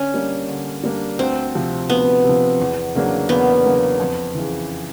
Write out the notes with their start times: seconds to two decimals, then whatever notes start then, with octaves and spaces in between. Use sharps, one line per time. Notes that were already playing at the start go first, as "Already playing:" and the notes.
Already playing: D3 C#4
0.14 G3 A#3 D4
0.48 D3
0.84 G3 A#3 D4
1.19 D2 C4
1.55 C3 F3
1.90 D2 B3
2.25 C3 F3
2.60 E2
2.95 C#3 F#3 A#3 D4
3.29 E2 B3
3.65 C#3 F#3 A#3 D4
4.00 F2
4.35 C#3 E3